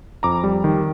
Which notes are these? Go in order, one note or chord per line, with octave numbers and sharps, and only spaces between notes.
F2 A#5 D6
G3
D#3